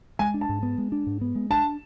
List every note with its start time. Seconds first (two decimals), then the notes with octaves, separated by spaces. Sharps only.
0.19 G#3 G#5
0.34 D4
0.41 A5
0.49 G#2
0.63 B3
0.78 G#3
0.92 D4
1.07 G#2
1.21 B3
1.35 G#3
1.50 D4 A5